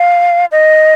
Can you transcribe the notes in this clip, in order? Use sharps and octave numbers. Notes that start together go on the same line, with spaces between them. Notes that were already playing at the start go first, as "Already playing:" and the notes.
Already playing: F5
D#5